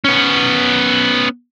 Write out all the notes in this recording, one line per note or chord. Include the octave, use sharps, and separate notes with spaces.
B3 C#4